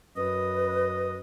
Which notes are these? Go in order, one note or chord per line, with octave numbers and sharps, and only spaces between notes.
F#2 B4 D#5